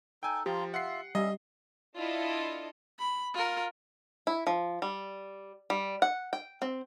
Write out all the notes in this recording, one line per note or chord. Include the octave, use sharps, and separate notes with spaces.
D#4 A4 G5 G#5
F3 F4 G4 A#5 C6
F4 E5 F#5 C7
G3 C#4 D#5 E5
D4 E4 F4 A4 D#5
B5
F4 A#4
E4
F3
G3
G3
F#5
G5
C4